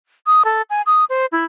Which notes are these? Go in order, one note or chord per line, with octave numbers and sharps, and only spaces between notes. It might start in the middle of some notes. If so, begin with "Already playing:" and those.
D#6
A4
G#5
D#6
C5
E4